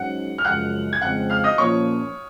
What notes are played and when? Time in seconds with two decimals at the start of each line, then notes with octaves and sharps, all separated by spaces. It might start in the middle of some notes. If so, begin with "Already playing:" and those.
Already playing: G#2 F#3 C#4 F#5
0.38 F6
0.45 F#2 C#3 F3 G#3 F#5 F#6
0.93 G#6
1.01 F2 C#3 G#3 C4 F#5 F#6
1.30 F5 F6
1.44 D#5 D#6
1.58 A#2 F3 A#3 C#4 C#5 C#6